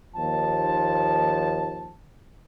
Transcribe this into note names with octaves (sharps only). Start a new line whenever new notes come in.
D#2 F3 A5